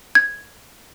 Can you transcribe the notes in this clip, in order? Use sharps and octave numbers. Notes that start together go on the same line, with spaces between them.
G#6